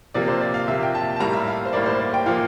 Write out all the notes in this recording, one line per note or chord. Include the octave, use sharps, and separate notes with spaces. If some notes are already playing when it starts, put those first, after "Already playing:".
C3 F3 A#3 D5
C5
D5
F5
C3 F3 A#3 E5
G5
A5
A5
A2 G3 A#3 A#5
E5
F5
C5
A2 G3 A#3 D5
C5
D5
G5
A#2 F3 A#3 F5